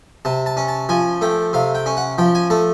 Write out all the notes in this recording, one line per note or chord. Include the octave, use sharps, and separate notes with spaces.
C3 A5
A5
C#4
A5
F3 G#5
A3 G5
C3 F5
G5
C#4
F#5
F3 G5
G#5
A3 A5